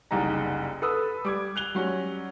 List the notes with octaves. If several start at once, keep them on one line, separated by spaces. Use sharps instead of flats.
F#1 C2 G2 D#4 A#5
A4 B4 B5 D#6 E6
G3 D6 G#6
F#6 F7 G7
F#3 G3 C#4